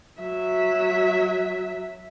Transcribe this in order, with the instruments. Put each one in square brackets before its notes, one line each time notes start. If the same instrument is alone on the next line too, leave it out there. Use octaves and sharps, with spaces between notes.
[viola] F#3 E5